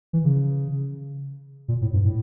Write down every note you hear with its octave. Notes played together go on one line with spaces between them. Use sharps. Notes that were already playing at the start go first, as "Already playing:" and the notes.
E3
C#3
A#2
A2
G2
A2